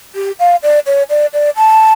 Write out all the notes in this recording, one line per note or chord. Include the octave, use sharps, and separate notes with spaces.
G4
F5
D5
C#5
D5
D5
A5